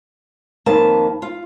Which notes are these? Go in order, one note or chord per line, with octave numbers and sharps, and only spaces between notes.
F2 D#3 A#3 B4 A5
F4